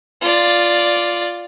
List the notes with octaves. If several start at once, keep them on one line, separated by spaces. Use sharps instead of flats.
F4 D5